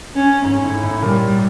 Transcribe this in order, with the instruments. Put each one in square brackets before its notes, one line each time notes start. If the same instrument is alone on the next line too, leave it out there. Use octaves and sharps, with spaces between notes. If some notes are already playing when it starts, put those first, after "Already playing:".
[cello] C#4
[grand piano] G#2 [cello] C#4
[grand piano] A2
A2
[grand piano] A#2 [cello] G3